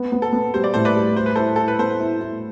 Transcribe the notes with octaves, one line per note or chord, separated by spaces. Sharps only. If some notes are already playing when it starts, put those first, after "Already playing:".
Already playing: B3
B3
A4
B3
G3 C5
D5
A2 A4 C5
B4 D5
G3
G3 C5
B4
E4 A4 C5
E4 A4
B4
B3 A4 C5
E4
E4